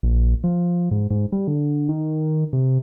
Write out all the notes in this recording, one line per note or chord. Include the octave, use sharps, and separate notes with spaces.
A#1
F3
G#2
G#2
G3
D3
D#3
C3